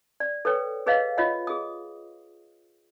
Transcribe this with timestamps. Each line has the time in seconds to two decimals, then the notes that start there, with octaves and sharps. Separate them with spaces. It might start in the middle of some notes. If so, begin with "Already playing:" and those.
0.20 D5
0.45 A4 B4 C#5 G5
0.86 G#4 B4 C#5 D#5 F5
1.18 F4 C#5 D#5 F#5
1.47 G#4 D#6